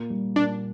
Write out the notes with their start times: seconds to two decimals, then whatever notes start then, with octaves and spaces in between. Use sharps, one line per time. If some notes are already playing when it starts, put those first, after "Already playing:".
Already playing: A#2 A#3
0.10 G3
0.36 A#2 A#3 D4